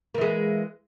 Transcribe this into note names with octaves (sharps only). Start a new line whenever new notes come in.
E3 G#3 A#3